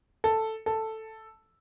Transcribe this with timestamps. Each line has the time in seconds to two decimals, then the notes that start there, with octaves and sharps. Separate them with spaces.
0.24 A4
0.66 A4